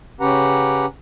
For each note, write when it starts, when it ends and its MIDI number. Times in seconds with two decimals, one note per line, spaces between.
0.21 0.86 49
0.21 0.86 61
0.21 0.86 67
0.21 0.86 71
0.21 0.86 78
0.21 0.86 82